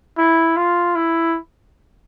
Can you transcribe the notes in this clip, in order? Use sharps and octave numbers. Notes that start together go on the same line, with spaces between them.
E4
F4
E4